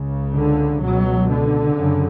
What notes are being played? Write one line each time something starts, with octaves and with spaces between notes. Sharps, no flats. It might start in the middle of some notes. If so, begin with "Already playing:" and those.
Already playing: C#2 C#3
D3
C#2 B2 F#3
D3
F#2 C#3